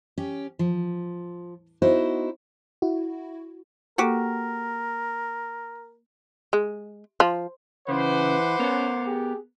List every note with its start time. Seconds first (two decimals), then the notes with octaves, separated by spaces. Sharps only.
0.18 C#4 G4
0.59 F3
1.82 B3 D#4 E4 F#4 C5 D#5
2.82 E4 F#4
3.98 A#3 F#4 G4 A4 A#4
6.53 G#3
7.20 F3
7.89 C#3 E3 B4 C5 F#5 D6
8.59 B3 C#4 A#4
9.06 G4 G#4